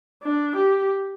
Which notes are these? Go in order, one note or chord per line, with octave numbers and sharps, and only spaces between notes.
D4
G4